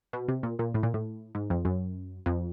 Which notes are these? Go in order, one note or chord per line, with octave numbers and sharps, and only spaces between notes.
B2
C3
A#2
A#2
A2
A#2
A2
G#2
F2
F#2
F2